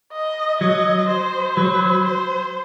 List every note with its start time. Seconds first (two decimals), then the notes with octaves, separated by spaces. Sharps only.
0.12 D#5
0.60 F#3 D#5
1.09 C5
1.57 F#3
2.05 C5